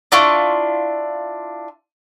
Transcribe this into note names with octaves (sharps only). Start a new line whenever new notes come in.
D4 E4 F4 C#6